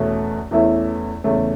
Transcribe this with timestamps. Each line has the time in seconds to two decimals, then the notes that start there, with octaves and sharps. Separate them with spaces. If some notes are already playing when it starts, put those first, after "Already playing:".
Already playing: E2 B2 A3 C#4
0.51 E2 E3 A3 C#4 E4
1.24 E2 C#3 A3 C#4